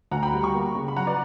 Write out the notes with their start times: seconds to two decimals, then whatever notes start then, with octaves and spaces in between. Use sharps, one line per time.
0.11 D2 F#5 A#5
0.22 G5 B5
0.34 G3
0.44 A#5 C#6
0.54 A#3
0.75 C#3
0.88 B5
0.97 F#3 F#5 A#5
1.07 B4 D5